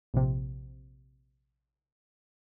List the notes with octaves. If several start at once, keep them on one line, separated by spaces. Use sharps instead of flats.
A#1 C3